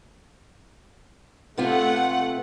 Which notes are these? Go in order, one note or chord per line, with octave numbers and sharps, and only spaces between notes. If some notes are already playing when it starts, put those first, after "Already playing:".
C3 A3 B3 F4 F#5